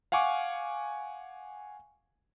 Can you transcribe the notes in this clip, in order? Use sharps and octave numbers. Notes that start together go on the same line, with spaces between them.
F5 F#5 G#5 C#6 D6